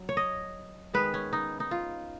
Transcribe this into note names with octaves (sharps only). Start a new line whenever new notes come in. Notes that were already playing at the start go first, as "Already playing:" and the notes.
Already playing: F#3
C#5
D#5
D#3 G#3 B3 B4
C#4
D#4
D#4
F4